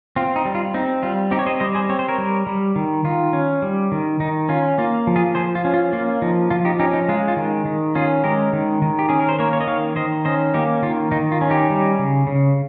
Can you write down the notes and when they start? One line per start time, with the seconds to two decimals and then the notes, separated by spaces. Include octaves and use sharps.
0.16 C4 F4
0.36 D#4
0.45 G3
0.55 F4
0.74 C4 D#4
1.03 G3 F4
1.31 C4 D#4 G4
1.39 C#5
1.46 C5 D#5
1.60 G3 C5 D#5
1.75 G#4 C5
1.89 C4 C#5
1.99 C5
2.08 A#4 C#5
2.18 G3
2.47 G3
2.76 D#3
3.04 D#3 F4
3.33 C#4
3.62 G3
3.92 D#3
4.20 D#3 D#4
4.49 C#4 F4
4.78 A#3 F4
5.07 F3
5.16 F4 G#4
5.35 F3 G#4 C5
5.55 F4
5.65 C#4
5.74 F4
5.92 A#3 F4
6.22 F3 D#4
6.50 F3 F4
6.65 D#4 G4
6.79 C#4 D#4 G4
6.94 D#4
7.09 G#3 F4
7.28 F4
7.37 D#3
7.65 D#3
7.95 C#4 F4 G#4
8.24 G#3 G4 A#4
8.53 D#3
8.82 D#3
8.99 G4
9.09 C#4 G#4
9.20 A#4
9.29 C5
9.39 A#3 A#4 C#5
9.53 C#5
9.61 D#5
9.67 D#3 C#5 F5
9.96 D#3 C5 D#5
10.25 C#4 C5 D#5
10.54 A#3 D#4 G4
10.82 D#3 F4
11.11 D#3 D#4
11.32 F4
11.41 C#4
11.50 D#4 G4
11.70 G3
11.99 C#3
12.27 C#3